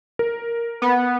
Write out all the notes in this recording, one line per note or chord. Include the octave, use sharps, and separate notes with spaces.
A#4
B3